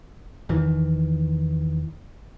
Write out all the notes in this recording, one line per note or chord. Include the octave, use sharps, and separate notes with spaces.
E2 D#3 E3